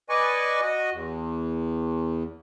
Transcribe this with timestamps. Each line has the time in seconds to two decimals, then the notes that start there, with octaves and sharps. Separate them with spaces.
0.09 B4 D5 D#5 G#5 C#6
0.61 F#4 D#5
0.92 E2